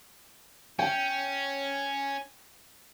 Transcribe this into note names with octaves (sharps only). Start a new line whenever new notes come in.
C#4 G5